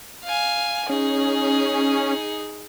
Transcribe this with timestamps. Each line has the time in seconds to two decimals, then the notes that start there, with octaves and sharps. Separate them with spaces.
0.24 F5 G#5
0.90 C#4 D#4 G#4